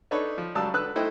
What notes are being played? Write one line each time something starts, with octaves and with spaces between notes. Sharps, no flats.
D4 D#4 A4 B4 C#5
F3
C#2 F#3 G3 A5 E6
D3 B4 E6 F#6
A3 E4 C5 D#5 G5